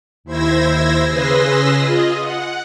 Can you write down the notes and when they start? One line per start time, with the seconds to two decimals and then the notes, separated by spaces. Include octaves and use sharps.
0.24 D#2 E4 C5 E6 G#6 A#6
1.08 C#3 G#4 B4 C6 E6 A#6
1.76 F4 G#4 D#5
2.20 F#5